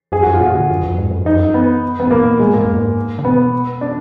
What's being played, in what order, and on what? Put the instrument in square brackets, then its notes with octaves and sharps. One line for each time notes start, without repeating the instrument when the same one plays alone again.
[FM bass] F#2 [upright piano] G#4
[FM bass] F#2 [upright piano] F#4
[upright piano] F4
[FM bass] A#2 [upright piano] F#4
[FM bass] D3
F#2
F2
G#2
F#2
[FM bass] F2 [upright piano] D#4
[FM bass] F#2
[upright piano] B3
B3
[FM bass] G#2
[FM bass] A#2 [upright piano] A#3
[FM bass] A#2 [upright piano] G#3
[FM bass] G#2 [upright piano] A#3
[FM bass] F#2
G#2
D3
[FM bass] B2 [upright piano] B3
[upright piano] D4